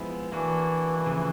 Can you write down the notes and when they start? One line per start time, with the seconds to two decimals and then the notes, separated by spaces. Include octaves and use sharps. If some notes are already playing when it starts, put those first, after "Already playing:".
Already playing: F3 G#3 B3 E4
0.32 E3 A#3 D4 F#4
1.06 C#3 F3 A3